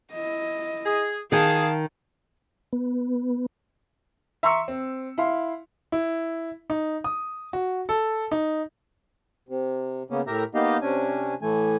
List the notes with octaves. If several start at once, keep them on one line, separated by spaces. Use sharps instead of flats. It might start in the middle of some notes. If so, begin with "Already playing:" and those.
E4 D#5
G#4
D#3 G#4 F5 A5
B3
E5 A#5 C6 C#6 E6 C#7
C4
E4 F5 C6
E4
D#4
D#6
F#4
A4
D#4
C3
C#3 A#3 B3 C#4
A2 G4 A#4 E5 A#5
A#3 B3 D#4 G4 D#5 F5
C3 C#4 D4 G#5
A2 E3 A3 G#5